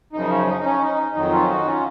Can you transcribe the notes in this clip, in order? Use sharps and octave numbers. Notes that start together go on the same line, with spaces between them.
F#2 C#3 F3 D#4
C#4
D#4
C#4
D#4
F2 D#3 F#3 D#4
C#4 F4
D#4 F#4
C#4 F4